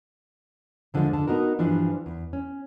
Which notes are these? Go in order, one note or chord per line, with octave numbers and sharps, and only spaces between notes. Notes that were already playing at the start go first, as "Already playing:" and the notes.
E2 D3 F3 G#3
D3 A5
B3 D#4 F#4 A#4
G2 E3 F3 D4
E2
C#4